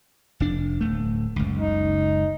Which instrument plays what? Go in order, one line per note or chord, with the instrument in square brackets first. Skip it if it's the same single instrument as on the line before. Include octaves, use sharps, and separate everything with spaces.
[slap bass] F1 D4
D1 A3
F#1 C#2
[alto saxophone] D#4